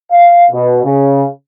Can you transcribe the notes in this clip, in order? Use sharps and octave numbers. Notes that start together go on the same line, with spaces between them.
F5
B2
C#3